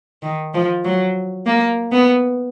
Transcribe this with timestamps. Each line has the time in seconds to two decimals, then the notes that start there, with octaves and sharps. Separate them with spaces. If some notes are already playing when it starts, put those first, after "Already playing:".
0.22 D#3
0.54 F3
0.84 F#3
1.46 A#3
1.92 B3